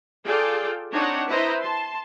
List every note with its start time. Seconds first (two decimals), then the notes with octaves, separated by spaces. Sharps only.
0.25 F4 G#4 A4 D5 F5 G5
0.92 C4 D4 D#4 C#5 F#5
1.29 E4 B4 C5 D#5 A#5
1.62 A5 C6